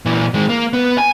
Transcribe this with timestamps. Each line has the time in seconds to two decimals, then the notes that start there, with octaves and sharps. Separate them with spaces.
0.06 A#2 E3
0.34 D#3 G#3
0.49 A#3
0.73 B3
0.98 G#5